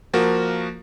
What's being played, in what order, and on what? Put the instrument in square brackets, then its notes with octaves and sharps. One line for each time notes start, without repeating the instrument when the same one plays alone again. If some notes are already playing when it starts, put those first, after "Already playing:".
[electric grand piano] F3 A#3 F#4 A#4